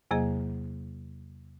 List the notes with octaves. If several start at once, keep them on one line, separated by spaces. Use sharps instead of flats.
E2 C3 F#3 A#3 G#4 D#5